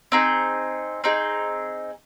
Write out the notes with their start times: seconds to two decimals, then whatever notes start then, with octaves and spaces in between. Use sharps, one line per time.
0.12 C4 D#4 G#4
1.04 C4 D#4 G#4